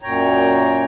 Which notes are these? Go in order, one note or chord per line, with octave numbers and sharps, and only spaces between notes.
F#2 A#2 C#5 G5 A#5